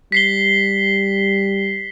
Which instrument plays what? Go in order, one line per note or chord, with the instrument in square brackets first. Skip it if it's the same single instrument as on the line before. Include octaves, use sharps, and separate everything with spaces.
[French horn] G3 [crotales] B6 C7 G7